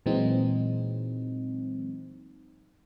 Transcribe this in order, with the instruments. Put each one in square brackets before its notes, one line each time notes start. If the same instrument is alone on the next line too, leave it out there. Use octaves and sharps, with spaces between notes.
[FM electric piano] A#2 E3 F#3 G#3 C4 D#4